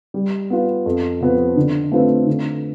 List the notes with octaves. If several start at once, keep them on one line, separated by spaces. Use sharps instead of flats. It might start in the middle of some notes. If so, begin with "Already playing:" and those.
G3
B3 F4
F2
C3 F3 B3
D3
A3 C4 F4 B4
D3